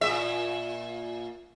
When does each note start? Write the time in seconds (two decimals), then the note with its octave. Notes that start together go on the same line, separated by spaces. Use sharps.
0.01 A#2 E5